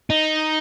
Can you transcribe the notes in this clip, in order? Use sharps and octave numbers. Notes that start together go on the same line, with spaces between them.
D#4